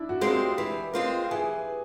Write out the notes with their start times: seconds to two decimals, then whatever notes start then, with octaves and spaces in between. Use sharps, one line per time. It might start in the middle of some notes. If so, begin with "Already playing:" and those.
Already playing: D4 E4
0.09 F#4
0.21 G#3 C4 F4 A#4
0.33 G4
0.58 E3
0.93 G#3 C4 F4 A#4
1.31 E3 G#4